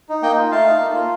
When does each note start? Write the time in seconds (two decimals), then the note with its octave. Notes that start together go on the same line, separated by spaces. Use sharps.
0.09 D#4
0.22 A#3 D#5 G5
0.37 F4
0.51 A3 F5 A5
0.66 D#4
0.80 A#3
0.95 F4